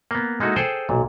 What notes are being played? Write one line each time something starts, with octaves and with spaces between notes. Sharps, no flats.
A#3 B3
G#3 A#3 D#4 E4 F#4 A4
G#4 A4 C5 G5 A5
B1 A#2